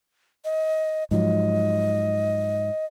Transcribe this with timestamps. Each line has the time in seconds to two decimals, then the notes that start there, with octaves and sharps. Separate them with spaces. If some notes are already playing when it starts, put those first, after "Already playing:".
0.45 D#5
1.11 G#2 F3 F#3 D#5